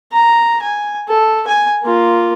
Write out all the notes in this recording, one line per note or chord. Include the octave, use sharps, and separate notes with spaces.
A#5
G#5
A4
G#5
A#3 F4